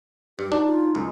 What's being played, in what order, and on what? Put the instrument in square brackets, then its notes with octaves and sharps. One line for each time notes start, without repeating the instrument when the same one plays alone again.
[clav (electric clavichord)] G2 [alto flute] G4
[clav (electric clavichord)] D4 [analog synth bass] D#4 [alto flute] F#4
[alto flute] F4
[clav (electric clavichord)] C#2 F#2 [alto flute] G#3